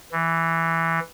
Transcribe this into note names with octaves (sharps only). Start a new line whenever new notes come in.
E3